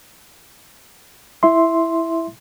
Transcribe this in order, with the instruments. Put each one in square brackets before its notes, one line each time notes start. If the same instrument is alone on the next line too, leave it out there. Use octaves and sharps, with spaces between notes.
[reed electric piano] E4 E5 C6